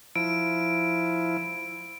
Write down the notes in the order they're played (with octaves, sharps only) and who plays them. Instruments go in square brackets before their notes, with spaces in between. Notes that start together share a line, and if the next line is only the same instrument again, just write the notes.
[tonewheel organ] F3 E4 [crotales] D7